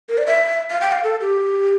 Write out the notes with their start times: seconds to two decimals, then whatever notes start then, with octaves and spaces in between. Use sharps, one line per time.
0.09 A#4
0.18 D5
0.27 E5
0.70 F5
0.81 G5
0.92 F5
1.04 A4
1.21 G4